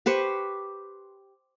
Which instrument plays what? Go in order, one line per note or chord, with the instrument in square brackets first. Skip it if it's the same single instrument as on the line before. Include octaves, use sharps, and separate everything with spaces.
[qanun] G4 B4 C5 C#6